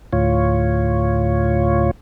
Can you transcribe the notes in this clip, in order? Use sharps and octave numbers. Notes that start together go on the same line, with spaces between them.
D2 A2 F4 C#5